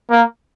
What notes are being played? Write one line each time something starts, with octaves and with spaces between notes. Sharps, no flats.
A#3